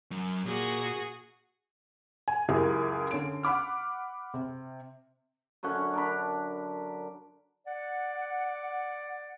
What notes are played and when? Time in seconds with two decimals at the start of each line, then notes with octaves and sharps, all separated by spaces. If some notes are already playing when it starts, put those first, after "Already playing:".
0.11 F#2
0.46 A#2 F#4 G#4
2.28 G#5
2.49 C#2 F#2 E4 G4 G#4 A#4
3.11 D3 C#4 D7
3.43 F#5 B5 D6 F6
4.34 C3
5.63 F#2 D3 C#4 F#5
5.93 D4 A#4 B5
7.67 D5 F#5